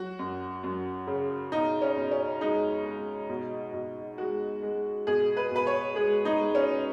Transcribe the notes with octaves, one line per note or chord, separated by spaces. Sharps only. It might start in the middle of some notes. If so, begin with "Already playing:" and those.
Already playing: F#3 F#4
F#2
F#2
C#3
B2 D#4
C#4
B2
C#4
G#3 D#4
G#3
B2
B2
G#3 F#4
G#3
B2 G#4
B4
B2 B4
C#5
G#3 G#4
D#4
G#3
C#4